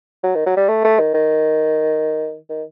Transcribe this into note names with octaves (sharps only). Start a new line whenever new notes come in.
F#3
D#3
F#3
G3
A3
A3
D#3
D#3
D#3